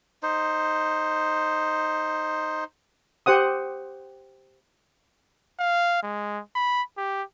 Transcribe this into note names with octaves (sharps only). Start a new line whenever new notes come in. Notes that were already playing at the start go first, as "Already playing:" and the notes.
D#4 C5
G4 C5 F#5 D#6
F5
G#3
B5
G4